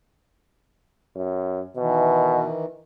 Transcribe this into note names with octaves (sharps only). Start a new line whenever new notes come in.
F#2
B2 D#3 E3